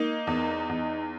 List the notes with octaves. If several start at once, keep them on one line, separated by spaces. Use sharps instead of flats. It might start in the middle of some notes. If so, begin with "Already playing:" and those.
Already playing: A#3 D#4
E2
E2